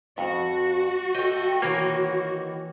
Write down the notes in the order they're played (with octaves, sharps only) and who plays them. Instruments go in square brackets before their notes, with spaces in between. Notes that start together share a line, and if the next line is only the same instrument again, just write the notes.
[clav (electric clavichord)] F2 [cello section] F#4
[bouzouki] A3 G5 [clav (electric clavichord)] D#5
[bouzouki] D#3 E3 C#5 [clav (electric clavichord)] A#3